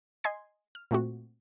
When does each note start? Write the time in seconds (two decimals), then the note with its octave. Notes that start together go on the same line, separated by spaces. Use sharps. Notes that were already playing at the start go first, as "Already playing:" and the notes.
0.24 D#5 G#5 C6 G#6 C7
0.75 F6
0.91 A#2 A3 C4 F#4